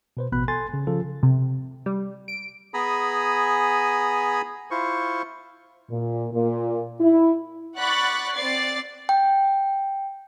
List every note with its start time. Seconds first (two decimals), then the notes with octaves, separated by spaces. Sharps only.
0.17 B2 B4 C5
0.32 A1 B2 B3 B5 F#6
0.48 A4 G#5 C6 A6
0.74 C#3
0.87 C#3 F3 F4 A4
1.23 C3
1.86 G3
2.28 D7
2.74 B3 G#4 G#5 A#5 B5 D#6
4.71 E4 F4 C5 C#6
5.91 A#2
6.33 A#2
7.01 E4
7.78 D5 F#5 B5 C#6 F#6 A6
8.33 C4 D5 A6 C7
9.09 G5